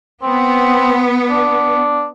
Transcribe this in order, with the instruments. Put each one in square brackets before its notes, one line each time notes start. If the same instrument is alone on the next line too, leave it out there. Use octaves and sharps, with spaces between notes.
[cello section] B3 [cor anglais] C4
[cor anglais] D4